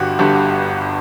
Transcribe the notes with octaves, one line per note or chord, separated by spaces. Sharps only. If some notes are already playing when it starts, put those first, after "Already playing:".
Already playing: G1 G2 D3 F#4 G4
G1 G2 D3 G4